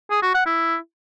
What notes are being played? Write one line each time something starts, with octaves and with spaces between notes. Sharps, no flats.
G#4
F#4
F#5
E4